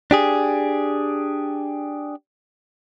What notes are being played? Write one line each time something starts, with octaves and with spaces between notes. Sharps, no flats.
D4 G4 G#4